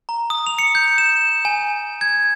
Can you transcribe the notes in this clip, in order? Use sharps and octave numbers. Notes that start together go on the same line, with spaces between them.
A#5
D#6
F7
C#7
G6
E7
G#5
G#6